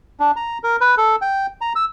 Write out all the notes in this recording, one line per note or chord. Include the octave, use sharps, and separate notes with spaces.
D4
A#5
A#4
B4
A4
G5
A#5
E6